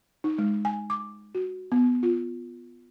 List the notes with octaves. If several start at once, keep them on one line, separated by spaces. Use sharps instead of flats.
D#4
G#3
G#5
D6
F#4
B3
F4